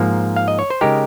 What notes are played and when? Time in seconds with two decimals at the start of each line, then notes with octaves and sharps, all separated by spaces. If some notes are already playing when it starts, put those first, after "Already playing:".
Already playing: G#2 F3 A#3
0.36 F5
0.48 D#5
0.59 C#5
0.70 C5
0.81 C#3 G#3 D#4 G4 A#4